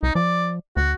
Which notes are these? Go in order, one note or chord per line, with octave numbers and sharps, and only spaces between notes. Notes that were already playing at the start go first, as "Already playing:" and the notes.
C2 D#4
F3 D5
D2 F#4